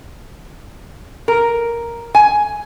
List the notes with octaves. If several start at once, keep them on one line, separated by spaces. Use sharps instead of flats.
A#4
G#5